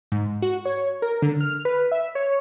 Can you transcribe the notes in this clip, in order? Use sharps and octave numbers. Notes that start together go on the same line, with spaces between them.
G#2
F#4
C#5
A#4
D3
F6
B4
E5
C#5